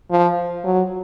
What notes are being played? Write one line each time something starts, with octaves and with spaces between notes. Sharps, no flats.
F3
F#3